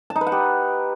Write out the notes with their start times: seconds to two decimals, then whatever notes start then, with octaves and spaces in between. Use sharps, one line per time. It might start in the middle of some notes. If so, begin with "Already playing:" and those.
0.10 A5
0.16 D#4
0.21 B4
0.27 F#5
0.32 G4